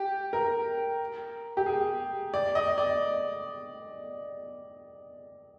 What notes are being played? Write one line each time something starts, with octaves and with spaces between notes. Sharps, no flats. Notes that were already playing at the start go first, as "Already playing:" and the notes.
Already playing: G4
A#4
G4
G#4
D5
D#5
D5